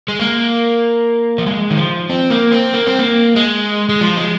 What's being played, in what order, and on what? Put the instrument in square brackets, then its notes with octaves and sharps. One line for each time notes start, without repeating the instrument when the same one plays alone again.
[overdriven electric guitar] G#3
A#3
F3
G#3
D#3
F3
C4
A#3
C4
A#3
C4
A#3
G#3
G#3
F3
G#3